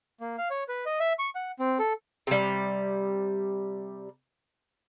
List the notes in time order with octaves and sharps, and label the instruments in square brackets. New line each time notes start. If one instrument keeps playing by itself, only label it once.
[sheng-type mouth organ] A#3
F5
C#5
B4
D#5
E5
C#6
F#5
C4
A4
[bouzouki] C3 G3